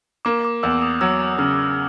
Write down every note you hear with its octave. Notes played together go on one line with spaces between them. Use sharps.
A#3 D6
D6
E2 E6
D#6
F#3 E6
C#3 F6